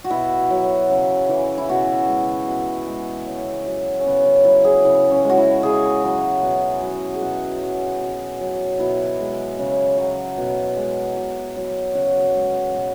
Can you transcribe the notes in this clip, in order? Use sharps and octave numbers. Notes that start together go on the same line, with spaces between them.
F#4
B2 E4
F#3
C#3
E3
E4
B2 F#4
G#3
B2
G#3
C#3
F#3
C#4
C#3 B3
C#4
F#3 E4
G#4
C#3 E4
C#4
G#3
F#4
E4
C#3 G#4
F#3
B2
F#3
G#4
B2 F#4
F#3
B2
F#3
B2 E4
G#3
C#3
F#3
B2
G#3
B2
F#3
C#3 F#4
G#3
B2